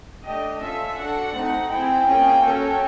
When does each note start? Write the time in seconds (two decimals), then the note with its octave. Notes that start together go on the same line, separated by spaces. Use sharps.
0.25 A3 D4 G4 D#5
0.62 C#4 F4 A4 E5
0.99 D4 F#4 A4 F#5
1.35 A3 C4 D#4 F#4
1.71 C4 E4 G#4 G5
2.07 A#3 C#4 F4 G#4
2.43 C#4 F#4 A4